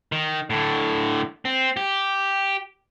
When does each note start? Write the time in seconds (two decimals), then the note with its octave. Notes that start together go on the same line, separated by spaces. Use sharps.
0.12 D#3
0.50 A2 D3
1.45 C4
1.77 G4